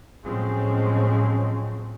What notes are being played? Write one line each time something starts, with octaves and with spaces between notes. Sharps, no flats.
A2 F3 F#3 G#3 C4 C#4